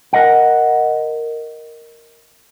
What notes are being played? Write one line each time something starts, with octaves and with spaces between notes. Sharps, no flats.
A#4 D#5 F#5